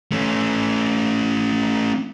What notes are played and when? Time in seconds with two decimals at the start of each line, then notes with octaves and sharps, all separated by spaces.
0.12 A3 C#4